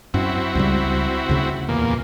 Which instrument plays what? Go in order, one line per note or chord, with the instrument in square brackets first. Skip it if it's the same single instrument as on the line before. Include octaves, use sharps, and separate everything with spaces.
[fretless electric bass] F#2 [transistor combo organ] C4 E4 F#4
[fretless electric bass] C#2 C#3 G3
D2 C#3
[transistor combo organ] E2 A#2 A#3